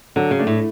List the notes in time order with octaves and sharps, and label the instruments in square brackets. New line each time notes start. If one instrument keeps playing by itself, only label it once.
[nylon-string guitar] D3 [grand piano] F#3
[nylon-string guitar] C#3
[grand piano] A3 D4
[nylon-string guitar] A2